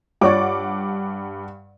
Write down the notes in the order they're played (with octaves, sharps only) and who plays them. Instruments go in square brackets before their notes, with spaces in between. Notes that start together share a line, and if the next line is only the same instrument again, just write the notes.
[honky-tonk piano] G2 F#5 D6 [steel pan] F4 C#5 D5